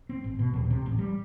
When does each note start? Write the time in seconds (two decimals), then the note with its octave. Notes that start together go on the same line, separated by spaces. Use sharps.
0.09 C4
0.24 G#1
0.39 B2
0.53 D#1
0.70 C3
0.86 A1
0.99 G3